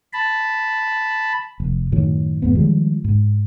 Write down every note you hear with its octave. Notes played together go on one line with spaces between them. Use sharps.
A5 B5
F1
F#2 A2 D#3 F#3
E2 G#2 B3
D#3 F3 G3 G#3
G#2